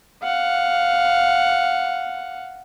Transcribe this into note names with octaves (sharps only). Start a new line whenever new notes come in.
F5 F#5